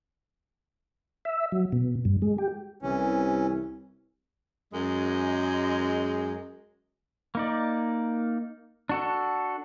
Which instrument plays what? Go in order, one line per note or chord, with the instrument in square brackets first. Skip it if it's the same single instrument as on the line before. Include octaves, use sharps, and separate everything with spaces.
[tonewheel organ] E5
F#3
B2
G2
G#3
G4
[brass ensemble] C2 [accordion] E3 C#4
[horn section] F#2 G#3
[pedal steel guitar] A#3 D#4 D5
D4 F#4 A4